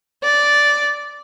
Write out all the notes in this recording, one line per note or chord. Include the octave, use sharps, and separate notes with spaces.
D5